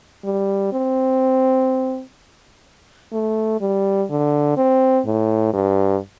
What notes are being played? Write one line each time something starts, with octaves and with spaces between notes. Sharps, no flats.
G3
C4
A3
G3
D3
C4
A2
G2